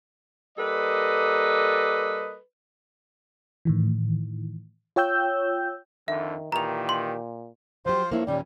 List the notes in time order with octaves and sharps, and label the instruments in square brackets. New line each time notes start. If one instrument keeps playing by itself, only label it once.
[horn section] G3 A#3 A4 B4 D5 D#5
[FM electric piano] A2 D#3 E3
F4 C#5 G5 E6 G6
[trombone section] F2 D3 [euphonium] D#3 [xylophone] E5
[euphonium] A#2 [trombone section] D#3 E3 G4 [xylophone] A#5 F7
[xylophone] C6
[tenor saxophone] F3 [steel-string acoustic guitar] F#3 G4 [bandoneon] F4 C5
[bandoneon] G2 [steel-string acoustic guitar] A#3 E4 C#5
[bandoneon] D#2 [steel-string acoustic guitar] A#2 D#3 C#4 [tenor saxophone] G3